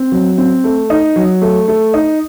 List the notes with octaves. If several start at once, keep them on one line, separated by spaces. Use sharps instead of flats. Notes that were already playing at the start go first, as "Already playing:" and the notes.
Already playing: C4
F#3
C4
A3
D#4
F#3
A3
A3
D#4